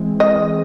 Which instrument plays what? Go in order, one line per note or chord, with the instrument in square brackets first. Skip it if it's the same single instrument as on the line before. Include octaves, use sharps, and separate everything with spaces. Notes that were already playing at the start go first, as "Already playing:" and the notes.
Already playing: [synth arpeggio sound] E3 G#3 C4
[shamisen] D#5